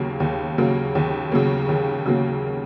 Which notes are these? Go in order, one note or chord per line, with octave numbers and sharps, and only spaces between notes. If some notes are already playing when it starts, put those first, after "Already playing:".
Already playing: D#2 C#3 F#3 A#3
D#2
C#3 F#3 A#3
D#2
C#3 F#3 A#3
D#2
C#3 F#3 A#3